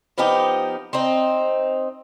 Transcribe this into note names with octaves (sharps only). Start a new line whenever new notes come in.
F3 B3 D#4 G4
C4 D#4